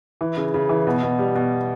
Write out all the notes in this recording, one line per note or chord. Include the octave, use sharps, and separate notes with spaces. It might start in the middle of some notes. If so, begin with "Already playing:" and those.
E3
C#3
C#3
E3
B2
B2
G3
B2